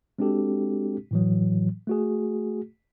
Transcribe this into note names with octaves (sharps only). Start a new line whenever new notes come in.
G#3 C4 D4 F#4 G4 A4
A2 E3 F#3
A3 F#4 G#4